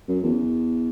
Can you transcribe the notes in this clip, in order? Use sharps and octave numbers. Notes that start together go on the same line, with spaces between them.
F#2
E2